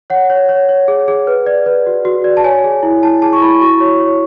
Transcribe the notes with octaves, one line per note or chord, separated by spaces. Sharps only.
C#5 F#5
C#5
C#5
C#5
G#4
G#4
B4
D5
B4
F#4
F#4
D5
A5
C#5 G#5
G#4
E4
E4 A5
G#4 A5
C#6
E4 B5
F#4 C#6
C#5
C#5